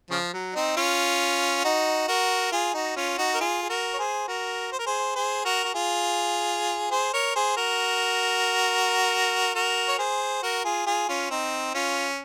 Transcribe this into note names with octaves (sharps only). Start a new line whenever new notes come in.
C#3 F3
F#3
C4 D#4
C#4 F4
D#4 F#4
F#4 A#4
F4 G#4
D#4 F#4
C#4 F4
D#4 F#4
A#4
F4 G#4
G#4
F#4 A#4
C#5
G#4 C5
F#4 A#4
C5
A#4
G#4 C5
G#4 C5
F#4 A#4
F#4
F4 G#4
G#4 C5
A#4 C#5
G#4 C5
F#4 A#4
F#4 A#4
C#5
G#4 C5
F#4 A#4
F4 G#4
F4 G#4
C#4 F4
C4 D#4
C#4 F4